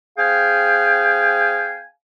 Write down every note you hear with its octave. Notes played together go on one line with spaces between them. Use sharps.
C4 G#4 F5 G5 G#5